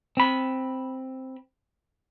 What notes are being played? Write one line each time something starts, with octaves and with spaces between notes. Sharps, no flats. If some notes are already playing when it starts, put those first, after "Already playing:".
C4 B5